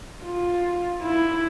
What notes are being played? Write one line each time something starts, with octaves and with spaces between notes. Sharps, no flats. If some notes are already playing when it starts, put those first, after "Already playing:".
F4
E4